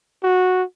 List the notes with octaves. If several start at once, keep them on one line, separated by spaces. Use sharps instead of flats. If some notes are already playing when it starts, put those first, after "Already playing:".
F#4